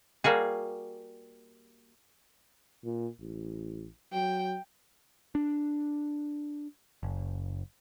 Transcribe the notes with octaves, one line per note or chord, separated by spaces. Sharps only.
G3 A#3 F#4 G#4
A#2
A1
F#3 G5
D4
F#1